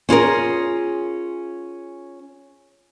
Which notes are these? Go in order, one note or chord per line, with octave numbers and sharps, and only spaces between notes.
C#4 F4 G#4 A#4